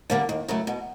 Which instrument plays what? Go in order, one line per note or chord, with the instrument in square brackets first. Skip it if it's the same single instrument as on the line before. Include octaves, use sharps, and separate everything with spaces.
[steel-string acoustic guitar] D3 G3 A#3 D4
D#2
C#3 F#3 A3
B2